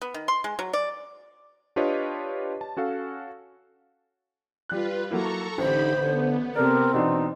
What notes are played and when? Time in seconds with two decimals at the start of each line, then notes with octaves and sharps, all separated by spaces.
0.02 B3
0.14 D#3
0.28 C6
0.44 G#3
0.59 F#3
0.73 D5
1.76 D4 F4 G4 B4 C#5 D#5
2.61 A5
2.77 C#4 F#4 A4 F5
4.69 G3 F4 B4 F#6
5.11 F#3 A#3 E4 A4 A#5 C#6
5.58 A1 D3 D#4 G4 C5 B5
5.95 D3 B3
6.55 C3 C4 A4 A#4 D5
6.94 B2 E3 D4 D#4